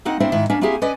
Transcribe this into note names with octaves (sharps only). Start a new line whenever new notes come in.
A#3 C4 D#4 F#5
A#3 C4 D4 E4 C5
G#2 D#3 E4
A#3 C#4 D4
A#3 C4 E4 G4 G#4
C#4 B4 D5 D#5